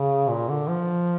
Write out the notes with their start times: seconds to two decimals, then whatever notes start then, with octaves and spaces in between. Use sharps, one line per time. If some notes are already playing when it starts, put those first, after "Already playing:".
Already playing: C#3
0.29 A#2
0.49 D3
0.68 F3